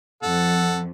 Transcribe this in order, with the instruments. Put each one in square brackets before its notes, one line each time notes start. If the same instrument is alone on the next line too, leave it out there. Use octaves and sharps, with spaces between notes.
[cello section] F2 [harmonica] A4 F#5